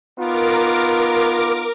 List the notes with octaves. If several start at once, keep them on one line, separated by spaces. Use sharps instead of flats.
B3 D#4 F4 A#4 D6